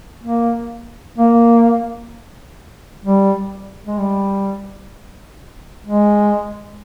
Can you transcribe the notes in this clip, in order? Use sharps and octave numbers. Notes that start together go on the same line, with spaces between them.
A#3
A#3
G3
G#3
G3
G#3